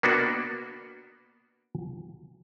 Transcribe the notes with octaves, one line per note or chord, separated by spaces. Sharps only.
A#3 B3 D4 F#4